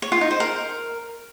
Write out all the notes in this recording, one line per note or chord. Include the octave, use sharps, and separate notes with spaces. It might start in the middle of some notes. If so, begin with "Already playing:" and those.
C#5
F4
D#4
C5
A#4